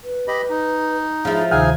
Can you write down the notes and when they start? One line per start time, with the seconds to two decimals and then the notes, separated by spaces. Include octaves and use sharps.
0.04 B4
0.28 G4 D#5 B5
0.50 D#4
1.25 F3 E4 G#4
1.51 D2 C3 D#3 D#4 G#4 F5 G#5